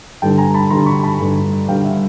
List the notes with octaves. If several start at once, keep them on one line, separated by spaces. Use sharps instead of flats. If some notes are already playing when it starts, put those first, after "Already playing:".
G2 D3 G3 G5 A5
G#5 A#5
A5 B5
G2 D3 G3 A#5 C6
B5 C#6
A5 B5
G2 D3 G3
G2 D3 G3 F5 G5
E5 F#5